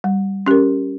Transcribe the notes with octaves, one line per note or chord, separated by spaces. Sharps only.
G3
C#4 G4 A#4